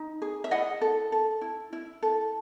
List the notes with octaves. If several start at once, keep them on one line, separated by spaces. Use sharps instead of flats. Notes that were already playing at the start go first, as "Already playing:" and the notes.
Already playing: D#4
G#4
E5
E4 D#5 F#5
A4
A4
E4
E4
A4